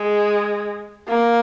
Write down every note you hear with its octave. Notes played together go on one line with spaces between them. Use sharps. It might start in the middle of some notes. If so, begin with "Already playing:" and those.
Already playing: G#3
A#3